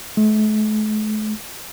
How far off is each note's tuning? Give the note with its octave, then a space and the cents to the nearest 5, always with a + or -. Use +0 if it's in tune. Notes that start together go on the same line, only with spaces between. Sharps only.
A3 -45